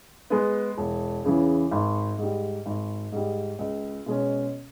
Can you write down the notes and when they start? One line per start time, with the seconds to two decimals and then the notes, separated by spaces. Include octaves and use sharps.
0.30 G#3 B3
0.77 E1
1.24 E2 C#3 E3
1.71 G#1
2.18 G#2 G3
2.66 G#1
3.12 G#2 G3
3.59 C#2
4.06 B2 G#3 C#4